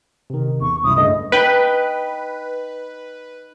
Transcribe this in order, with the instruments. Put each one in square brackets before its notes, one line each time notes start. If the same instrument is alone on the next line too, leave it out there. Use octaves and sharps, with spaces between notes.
[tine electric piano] C3 D#3
[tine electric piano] E2 [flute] C#6
[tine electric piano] C2 F#2 E4 [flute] D#6
[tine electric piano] G2 C#3 A3 [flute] D#5
[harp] D#4 G5 [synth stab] B4